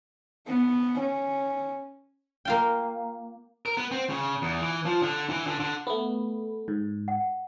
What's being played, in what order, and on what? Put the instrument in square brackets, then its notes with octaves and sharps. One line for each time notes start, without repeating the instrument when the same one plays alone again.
[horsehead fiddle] B3
C#4
[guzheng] A#3 F4 G5
[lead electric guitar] A#4
B3
C4
C#3
E2
E3
F3
D3
E3
D3
D3
[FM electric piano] A3 B3 [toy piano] B5
[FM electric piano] G#2
[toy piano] F#5